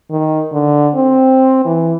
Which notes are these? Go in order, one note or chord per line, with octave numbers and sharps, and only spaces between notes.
D#3
D3
C4
E3